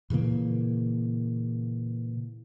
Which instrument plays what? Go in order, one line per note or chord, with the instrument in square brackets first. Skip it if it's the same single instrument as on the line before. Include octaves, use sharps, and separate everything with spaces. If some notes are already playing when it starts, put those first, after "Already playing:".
[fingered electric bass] A#2 C#3 E3 A#3